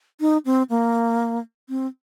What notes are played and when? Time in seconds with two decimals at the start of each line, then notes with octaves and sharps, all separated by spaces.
0.20 D#4
0.45 C4
0.70 A#3
1.69 C4